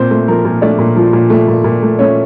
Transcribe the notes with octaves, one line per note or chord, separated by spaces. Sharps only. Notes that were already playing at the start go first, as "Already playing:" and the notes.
Already playing: A#2 C4 C5
A3
F3 A#4
A#2
A3 D4 D5
A#2
F3
A#2
A3
A#2
A#2
A3
A3 C#4 C#5